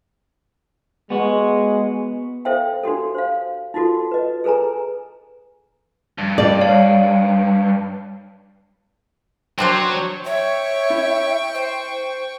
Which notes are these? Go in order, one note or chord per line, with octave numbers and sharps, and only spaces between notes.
G#3 B3 F#4
A4 C5 E5 F5 G5
D4 F#4 G4 A4
C5 F5
D#4 F4 F#4 A4
B4 D#5
G#4 A4 B4 G#5 A#5
G2
D5
C#5 F5
F#3 C4 D4 C5
C#5 E5 G5 C#6
E4
C5